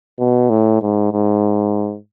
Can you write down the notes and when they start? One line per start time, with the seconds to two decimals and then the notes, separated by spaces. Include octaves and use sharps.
0.19 B2
0.50 A2
0.82 G#2
1.12 G#2